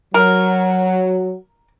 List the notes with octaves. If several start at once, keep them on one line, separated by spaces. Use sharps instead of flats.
F#3 A#4